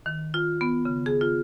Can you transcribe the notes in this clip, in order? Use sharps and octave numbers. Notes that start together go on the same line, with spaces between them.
D#3
F4
B3
C#3
G#4
F4